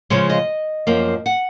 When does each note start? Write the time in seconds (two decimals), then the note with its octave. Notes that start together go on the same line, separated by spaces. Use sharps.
0.10 C#3 F3 G#3 C#5
0.29 D#5
0.87 F#2 F3 A#3
1.26 F#5